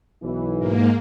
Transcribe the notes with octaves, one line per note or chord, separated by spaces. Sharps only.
B1 E3
G#2 A#3